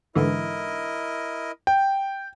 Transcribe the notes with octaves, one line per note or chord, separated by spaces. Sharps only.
G#2 D3 E3 E4 A#4 D#5
G5